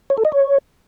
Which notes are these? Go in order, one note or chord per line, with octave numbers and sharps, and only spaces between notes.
C#5
A4
D#5
C#5